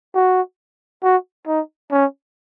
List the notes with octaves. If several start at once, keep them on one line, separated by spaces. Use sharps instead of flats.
F#4
F#4
D#4
C#4